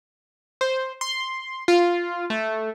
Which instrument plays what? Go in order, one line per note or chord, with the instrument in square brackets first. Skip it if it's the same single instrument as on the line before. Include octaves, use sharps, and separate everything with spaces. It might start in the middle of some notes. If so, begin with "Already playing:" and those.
[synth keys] C5
C6
F4
A3